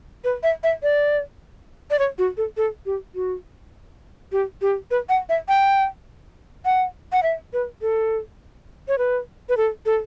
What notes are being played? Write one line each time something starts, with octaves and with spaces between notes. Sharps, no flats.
B4
E5
E5
D5
D5
C#5
F#4
A4
A4
G4
F#4
G4
G4
B4
F#5
E5
G5
F#5
F#5
E5
B4
A4
C#5
B4
B4
A4
A4